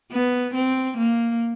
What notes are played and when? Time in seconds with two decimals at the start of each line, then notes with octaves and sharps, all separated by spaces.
0.11 B3
0.54 C4
0.97 A#3